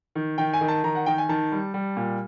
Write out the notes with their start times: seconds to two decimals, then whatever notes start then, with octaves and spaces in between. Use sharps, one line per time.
0.15 D#3
0.38 D#3 G5
0.53 G#5
0.61 D#3
0.68 A5
0.84 D#3 A#5
0.95 F#5
1.06 D#3 G5
1.18 G#5
1.29 D#3 A5
1.52 G3
1.74 G3
1.97 A#2